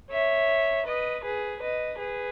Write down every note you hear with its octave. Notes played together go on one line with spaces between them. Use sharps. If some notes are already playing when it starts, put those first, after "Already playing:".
C#5 E5
B4 D#5
G#4 B4
B4 D#5
G#4 B4